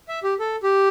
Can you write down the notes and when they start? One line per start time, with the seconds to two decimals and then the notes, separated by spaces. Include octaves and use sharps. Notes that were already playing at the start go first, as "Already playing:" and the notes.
0.08 E5
0.23 G4
0.40 A4
0.63 G4